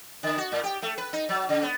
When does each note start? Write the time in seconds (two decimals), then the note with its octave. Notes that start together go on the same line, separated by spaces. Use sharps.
0.23 D3
0.38 F#4
0.52 A2
0.63 G4
0.82 A3
0.98 B4
1.13 D#4
1.29 F#3
1.49 C#3
1.63 B3